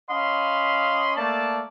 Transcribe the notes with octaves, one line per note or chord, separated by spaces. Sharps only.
C#4 D#5 F5 B5 C6
A3 A#3 D5 A5